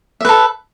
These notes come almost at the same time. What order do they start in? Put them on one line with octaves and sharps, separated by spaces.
E5 B4 A4